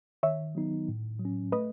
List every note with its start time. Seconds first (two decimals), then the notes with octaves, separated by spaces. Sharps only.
0.23 D#3 C#5 E5
0.55 F#3 B3 D#4
0.88 A2
1.19 F#3
1.25 C#4
1.52 A3 B4 D#5